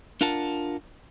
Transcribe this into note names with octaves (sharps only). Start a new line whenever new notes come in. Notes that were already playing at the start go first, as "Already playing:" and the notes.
D4 F4 A#4 F#5 A5